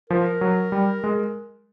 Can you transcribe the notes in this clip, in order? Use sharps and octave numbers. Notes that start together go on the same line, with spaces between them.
F3 A#4
F#3
G3
G#3